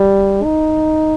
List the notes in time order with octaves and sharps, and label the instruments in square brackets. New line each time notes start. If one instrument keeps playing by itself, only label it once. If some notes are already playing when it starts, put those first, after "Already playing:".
Already playing: [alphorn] G3
D#4